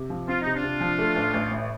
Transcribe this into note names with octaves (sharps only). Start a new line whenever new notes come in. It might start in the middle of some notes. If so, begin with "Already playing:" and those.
Already playing: C3
F3
C4 F4
C3 D#4
D4 F4
C3
F3
A3
A1
A1
A2